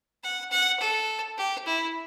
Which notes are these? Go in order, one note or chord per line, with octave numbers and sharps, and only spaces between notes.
F#5
F#5
A4
G4
E4